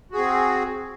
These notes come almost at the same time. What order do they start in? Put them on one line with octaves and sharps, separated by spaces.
F#4 G#4 C4